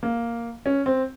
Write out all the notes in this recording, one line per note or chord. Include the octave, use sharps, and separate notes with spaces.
A#3
C#4
C4